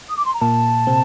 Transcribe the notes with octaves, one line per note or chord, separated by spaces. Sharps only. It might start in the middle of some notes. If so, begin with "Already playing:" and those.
D#6
D6
C6
A#5
A#2 A#3 A5
C3 C4